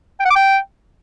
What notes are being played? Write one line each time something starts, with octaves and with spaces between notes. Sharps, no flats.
G5
F#5
D6
G5